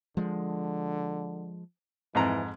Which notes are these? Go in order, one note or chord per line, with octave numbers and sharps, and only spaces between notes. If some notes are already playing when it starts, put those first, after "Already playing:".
D3 F3 G#3
F2 G#2 E3 A#5